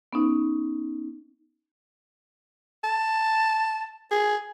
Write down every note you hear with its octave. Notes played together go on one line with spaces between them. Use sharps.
B3 C#4 D#4
A5
G#4